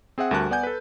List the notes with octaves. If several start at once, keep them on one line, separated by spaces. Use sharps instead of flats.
C4 G#4 E5 F#5
D2 G3 F#4 A#4 A5 F#6
B3 D5 F#5 G#5 G6
A4 B4